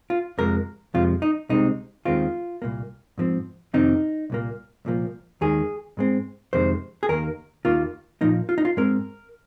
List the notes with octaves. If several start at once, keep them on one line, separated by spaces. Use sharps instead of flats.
F4
F2 C3 F3 G#3 A#4
F2 C3 F3 G#3 F4
D#4
C2 C3 G#3 C4 D#4
D#2 D#3 G#3 C4 F4
C2 A#2 A#3
G#2 F3 C4
F2 C3 D#3 C4 D#4
C2 A#2 A#3
C2 A#2 F3 A#3
D#2 D#3 G#3 G#4
G#2 G#3 C4
F2 C3 D#3 G#3 C5
G#4
D#2 D#3 A#3 A#4
D#2 D#3 A#3 F4
A#2 F3 A#3 D#4
F4
D#4
F4
G#2 G#3 C4 A#4